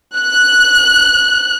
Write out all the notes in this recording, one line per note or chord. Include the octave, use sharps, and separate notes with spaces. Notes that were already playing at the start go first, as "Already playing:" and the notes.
F#6